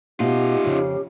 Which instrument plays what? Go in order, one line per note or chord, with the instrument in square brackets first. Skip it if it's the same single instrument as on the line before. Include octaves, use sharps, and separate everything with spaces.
[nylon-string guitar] B2 [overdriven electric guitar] D#4 F4 [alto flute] G4
[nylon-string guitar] F2 C#3